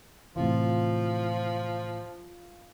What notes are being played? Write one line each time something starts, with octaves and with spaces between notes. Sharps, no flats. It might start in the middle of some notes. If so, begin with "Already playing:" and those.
A2 C3 E3 F3 F4